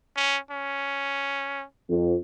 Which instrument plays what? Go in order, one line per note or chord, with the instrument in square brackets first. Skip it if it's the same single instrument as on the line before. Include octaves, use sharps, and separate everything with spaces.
[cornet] C#4
C#4
[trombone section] F2